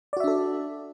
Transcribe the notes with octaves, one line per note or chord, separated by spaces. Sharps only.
D4 F#4 A4 D5 E5